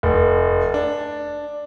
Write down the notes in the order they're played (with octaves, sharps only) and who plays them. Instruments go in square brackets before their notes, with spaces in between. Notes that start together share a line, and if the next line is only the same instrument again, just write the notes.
[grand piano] F1
D4